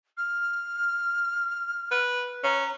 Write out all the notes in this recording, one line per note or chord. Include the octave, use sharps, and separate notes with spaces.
F6
B4
C#4 A#5